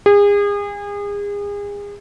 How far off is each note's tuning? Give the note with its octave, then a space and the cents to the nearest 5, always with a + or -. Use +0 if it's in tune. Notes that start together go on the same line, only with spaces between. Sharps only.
G#4 -35